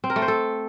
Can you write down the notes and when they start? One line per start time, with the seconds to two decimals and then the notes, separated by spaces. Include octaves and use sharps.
0.04 C4
0.10 A#4
0.16 A3
0.22 C5
0.28 A4